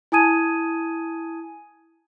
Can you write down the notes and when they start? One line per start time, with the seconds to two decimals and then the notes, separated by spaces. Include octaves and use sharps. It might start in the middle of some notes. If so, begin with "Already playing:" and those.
0.12 E4 G#5 A5 D#6 G#6 D#7